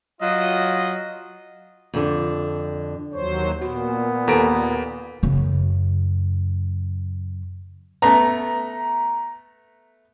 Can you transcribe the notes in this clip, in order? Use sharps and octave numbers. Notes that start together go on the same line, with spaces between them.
F#3 F4 D#5
F2 D3
D#2 F#3 C5 C#5
A#2 B3 F#4
D#2 A4 B4 G#5 A#5 D7
F#2 C#3
A3 B3 A#5